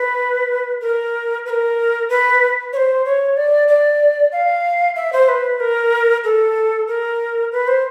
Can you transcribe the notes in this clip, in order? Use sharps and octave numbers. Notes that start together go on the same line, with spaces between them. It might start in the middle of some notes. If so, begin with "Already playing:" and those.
Already playing: B4
A#4
B4
A#4
B4
C#5
C5
C#5
D5
D5
F5
E5
C5
B4
A#4
A4
A#4
B4
C5